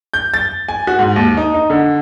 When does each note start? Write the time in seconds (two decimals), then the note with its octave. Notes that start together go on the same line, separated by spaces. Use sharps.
0.14 G6
0.34 A6
0.68 G#5
0.87 F#4
0.99 G#2
1.16 D#2
1.37 D#4
1.54 D#4
1.70 D3